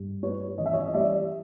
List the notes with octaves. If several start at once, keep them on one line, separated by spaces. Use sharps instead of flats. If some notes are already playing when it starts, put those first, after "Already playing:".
Already playing: G2
G3 B4 C#5
E3 D#5
E5
C#5 D#5
D#5
G3 D5 E5